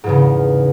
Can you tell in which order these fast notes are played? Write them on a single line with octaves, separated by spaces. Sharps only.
G#2 E2 C#3